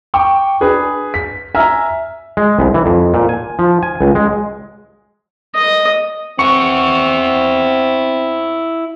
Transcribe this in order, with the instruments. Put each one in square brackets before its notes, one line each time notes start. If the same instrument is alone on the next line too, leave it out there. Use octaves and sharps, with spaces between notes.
[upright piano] G5 C#6 D6
D4 G#4 B4
B6
E5 G#5 A#5 F6
[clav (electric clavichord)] G#3
C2
E3
F2
A#2
G#5
F3
G#5
C#2
G#3
[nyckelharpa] D#5
[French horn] C4 [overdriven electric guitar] E4 F#5 [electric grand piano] C#6